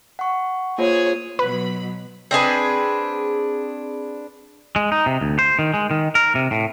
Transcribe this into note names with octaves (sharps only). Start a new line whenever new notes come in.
F#5 C#6
A#3 F4 G#4 C5 C#5
B2 F#3 B4 B5
C4 D4 G#4 B4
G#3
D#4
C3
D2
C5
D#3
G#3
D#3
A#4
C3
A2